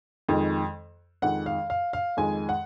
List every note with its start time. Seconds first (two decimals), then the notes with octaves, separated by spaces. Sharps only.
0.28 F2 D#3 G#3
1.22 F2 D#3 G#3 F#5
1.46 F5
1.70 F5
1.93 F5
2.17 F2 D#3 G#3 G#5
2.49 F#5